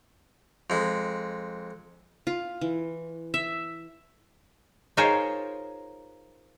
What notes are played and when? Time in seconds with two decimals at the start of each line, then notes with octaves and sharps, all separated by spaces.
0.70 F2 G#3
2.27 F4
2.61 E3
3.34 E5
4.97 D#4 F4 G#4 A#4 C5 C#5